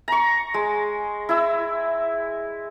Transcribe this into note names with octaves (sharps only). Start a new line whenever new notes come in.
A#5 C#6
G#3
E4 E6